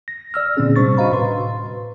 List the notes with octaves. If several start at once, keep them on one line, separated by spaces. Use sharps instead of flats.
A#6
D5 E6 F6
A#2 D3 A#3 C4 C#4 G#4
C3 G3 D4 C5 C#6 A6
F#4 C5 D#5 F5 A#5 B5
A2 B4 C6